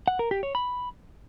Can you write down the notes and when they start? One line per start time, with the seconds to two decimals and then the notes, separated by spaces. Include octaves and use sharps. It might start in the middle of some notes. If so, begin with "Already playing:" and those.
0.08 F#5
0.19 A#4
0.31 G4
0.43 C#5
0.55 B5